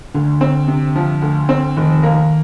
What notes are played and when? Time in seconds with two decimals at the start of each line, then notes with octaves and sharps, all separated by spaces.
0.15 D2 D3
0.41 C4
0.68 C3
0.96 F3
1.22 D2
1.49 C4
1.77 F1 D#3
2.03 A#3